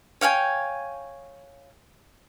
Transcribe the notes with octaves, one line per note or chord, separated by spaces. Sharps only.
C#5 F5 G5 G#5